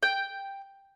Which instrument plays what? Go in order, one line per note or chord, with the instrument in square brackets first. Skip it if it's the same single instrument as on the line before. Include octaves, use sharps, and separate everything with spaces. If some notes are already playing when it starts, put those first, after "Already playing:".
[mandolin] G5